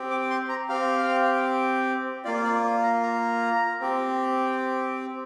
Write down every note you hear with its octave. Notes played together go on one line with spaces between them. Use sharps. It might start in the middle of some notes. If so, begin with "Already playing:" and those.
Already playing: C4 G4
D6
C6
A#5
C4 G4 F5
A#3 F4 D5
D5
A#5
A#5
C4 G4